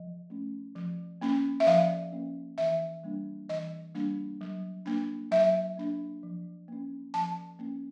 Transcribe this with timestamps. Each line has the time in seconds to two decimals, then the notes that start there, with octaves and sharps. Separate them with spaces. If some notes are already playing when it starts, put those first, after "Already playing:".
Already playing: F3 D#5
0.30 A3 C#4
0.75 F3
1.21 A#3 C#4
1.60 E5
1.67 F3 F5
2.12 A#3 C#4
2.58 E3 E5
3.04 G3 A#3 D4
3.49 E3 D#5
3.95 G3 A#3 D4
4.41 F#3
4.86 A#3 D4
5.31 F#3 E5
5.77 A#3 D4
6.23 F3
6.68 A#3 C#4
7.14 F3 A5
7.59 A#3 C#4